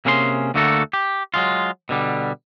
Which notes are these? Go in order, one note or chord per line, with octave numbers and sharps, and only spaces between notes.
C3 A#3 C#4 G#4 F5 C6
D2 D3 A3 A#3 F#4 A4
G4
F#3 G#3 F4
B2 D3 G3